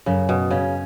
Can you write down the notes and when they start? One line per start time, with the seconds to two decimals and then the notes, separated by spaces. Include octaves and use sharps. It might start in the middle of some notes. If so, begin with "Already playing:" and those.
0.06 F#2 C#3
0.29 B2
0.51 C#3 C#4